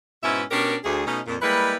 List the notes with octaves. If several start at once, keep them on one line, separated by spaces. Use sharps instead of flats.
G#2 B2 C#4 E4 B4 E5
B2 C#4 D4 G4 A#4
D2 G#4
B2 A3 C#4 D#4
F2 A#2
G3 G#3 A#3 E4 B4